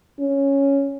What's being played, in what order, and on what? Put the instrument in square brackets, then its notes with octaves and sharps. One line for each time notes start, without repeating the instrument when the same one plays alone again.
[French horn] C#4